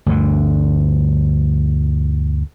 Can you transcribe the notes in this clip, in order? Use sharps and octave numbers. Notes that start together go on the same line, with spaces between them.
D2 G2 D3